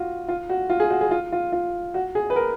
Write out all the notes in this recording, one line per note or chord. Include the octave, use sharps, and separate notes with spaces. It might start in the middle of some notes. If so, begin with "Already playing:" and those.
Already playing: F4 F#4
F4
F#4
F4
G#4
F#4
G#4
F4
F4
F4
F#4
G#4
B4
A#4